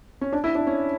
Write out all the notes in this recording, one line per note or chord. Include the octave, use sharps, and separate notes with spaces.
C#4
D4
E4
D4
C#4